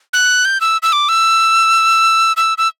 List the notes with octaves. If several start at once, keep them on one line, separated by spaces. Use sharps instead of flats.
F#6
G6
E6
E6
D6
E6
E6
E6